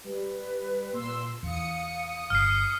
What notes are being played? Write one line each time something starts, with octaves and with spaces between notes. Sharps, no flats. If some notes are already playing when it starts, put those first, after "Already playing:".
G3 B4
A#2 C6 E6
E2 F5 D#6 C#7
G1 F6 C7